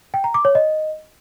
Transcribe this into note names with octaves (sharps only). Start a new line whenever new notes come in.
G5
A#5
D6
C#5
D#5